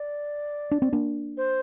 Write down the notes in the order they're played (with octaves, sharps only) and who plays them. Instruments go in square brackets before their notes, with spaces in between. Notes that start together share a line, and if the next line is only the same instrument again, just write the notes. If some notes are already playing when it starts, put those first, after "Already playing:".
Already playing: [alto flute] D5
[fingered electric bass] D4
C4
A#3 D4
[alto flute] C5